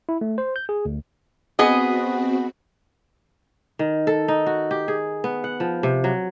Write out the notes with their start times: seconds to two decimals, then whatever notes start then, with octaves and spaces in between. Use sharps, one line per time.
0.09 E4
0.21 A3
0.38 C5
0.56 G6
0.69 G#4
0.85 D2
1.59 B3 C4 F#4 G#4 D#5
3.79 D#3
4.07 A4
4.28 D#4
4.46 F#4
4.71 G4
4.88 G#4
5.24 B3
5.44 F#5
5.60 F3
5.83 C3
6.04 F#3